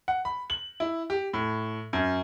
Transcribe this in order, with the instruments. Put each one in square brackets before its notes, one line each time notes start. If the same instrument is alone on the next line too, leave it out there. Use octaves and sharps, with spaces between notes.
[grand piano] F#5
B5
F#7
E4
G4
A2
F#2